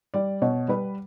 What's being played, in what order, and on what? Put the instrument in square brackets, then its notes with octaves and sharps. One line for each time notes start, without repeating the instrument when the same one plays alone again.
[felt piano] G3 D5
B2 C#5
G3 B4